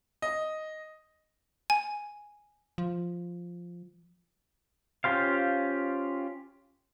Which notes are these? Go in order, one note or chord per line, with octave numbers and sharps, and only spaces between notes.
D#5
G#5
F3
C#4 F4 G4 C5 F5